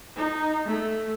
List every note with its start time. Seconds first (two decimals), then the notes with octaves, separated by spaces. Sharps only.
0.16 D#4
0.66 A3